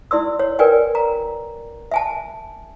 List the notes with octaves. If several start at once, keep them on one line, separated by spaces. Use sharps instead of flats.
E4 D5 C6 E6
C#5
A#4 B4 D5 G5 G#5
A#5
E5 G#5 A5